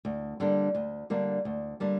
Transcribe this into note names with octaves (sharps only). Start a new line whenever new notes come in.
D2
D3 G3 A#3 D4
D2
D3 G3 A#3 D4
D2
D3 G3 A#3 D4